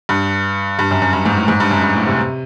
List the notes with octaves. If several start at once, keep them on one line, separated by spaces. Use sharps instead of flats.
G2
G2
F#2
F#2
G2
G#2
A2
G#2
G2
F#2
G2
A2
C3